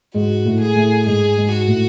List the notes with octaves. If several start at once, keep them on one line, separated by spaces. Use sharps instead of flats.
G#2 G#3 F#4
A2 A3
G#4
A2 A3
G#2 G#3 G#4
G#2 G#3
F#4
A2 A3